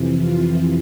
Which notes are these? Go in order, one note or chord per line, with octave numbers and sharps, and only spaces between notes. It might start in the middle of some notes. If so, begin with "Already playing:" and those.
Already playing: F2 C3 E3
F4